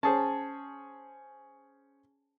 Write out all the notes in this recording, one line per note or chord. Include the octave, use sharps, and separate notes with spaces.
C#4 G#4 C5 A5